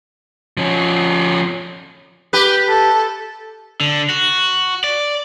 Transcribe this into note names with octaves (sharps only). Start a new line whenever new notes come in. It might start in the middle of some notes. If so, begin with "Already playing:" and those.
F3 C#4
G4 B4
A4
D3
F#4
D5